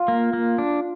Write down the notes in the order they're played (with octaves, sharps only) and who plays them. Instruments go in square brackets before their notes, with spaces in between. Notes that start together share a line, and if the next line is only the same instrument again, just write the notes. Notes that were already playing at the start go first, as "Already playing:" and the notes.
Already playing: [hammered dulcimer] F4
[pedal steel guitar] A#3
A#3
D4